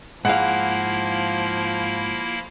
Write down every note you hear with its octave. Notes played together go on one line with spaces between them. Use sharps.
G#2 F3 A#3 E4 F5 F#5